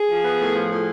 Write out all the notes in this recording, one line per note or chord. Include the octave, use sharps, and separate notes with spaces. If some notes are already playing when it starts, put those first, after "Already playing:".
Already playing: G#4
F3
B3
A2
F3
A2